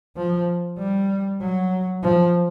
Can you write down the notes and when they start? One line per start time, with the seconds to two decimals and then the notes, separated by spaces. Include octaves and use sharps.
0.17 F3
0.78 G3
1.41 F#3
2.03 F3